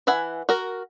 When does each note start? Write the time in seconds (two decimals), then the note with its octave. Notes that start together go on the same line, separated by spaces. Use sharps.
0.07 E3 E5 F#5 G#5
0.49 F#4 A#4